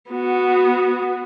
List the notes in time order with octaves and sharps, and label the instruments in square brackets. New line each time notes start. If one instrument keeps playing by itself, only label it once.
[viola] B3 F#4